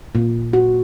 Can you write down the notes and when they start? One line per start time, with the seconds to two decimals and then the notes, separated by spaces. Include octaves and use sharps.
0.15 A#2
0.53 F#4